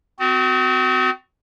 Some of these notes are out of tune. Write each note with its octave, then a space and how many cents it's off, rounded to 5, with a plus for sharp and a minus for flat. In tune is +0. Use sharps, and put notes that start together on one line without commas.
C4 -40 F#4 +0